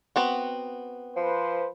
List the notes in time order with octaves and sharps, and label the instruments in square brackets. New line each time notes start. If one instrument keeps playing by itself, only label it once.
[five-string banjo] B3 C4 F#4
[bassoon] F3 [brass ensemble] B4 C5